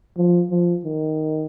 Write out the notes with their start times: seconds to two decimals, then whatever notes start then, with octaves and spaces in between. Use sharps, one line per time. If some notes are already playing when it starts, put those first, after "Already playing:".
0.17 F3
0.50 F3
0.85 D#3